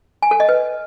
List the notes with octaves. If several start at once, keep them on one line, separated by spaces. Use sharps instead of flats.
G#5
A4
D#5
B4